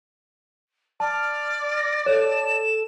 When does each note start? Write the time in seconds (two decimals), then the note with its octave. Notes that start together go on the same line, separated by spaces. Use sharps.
1.00 D5 A5 F6
1.76 A#6
2.06 A4 C#5 E7